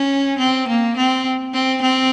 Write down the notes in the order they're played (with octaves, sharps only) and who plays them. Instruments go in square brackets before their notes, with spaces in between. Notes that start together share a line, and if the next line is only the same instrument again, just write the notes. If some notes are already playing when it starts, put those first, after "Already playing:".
Already playing: [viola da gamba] C#4
C4
A#3
C4
C4
C4